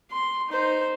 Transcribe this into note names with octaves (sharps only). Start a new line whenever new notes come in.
C6
D#4 C5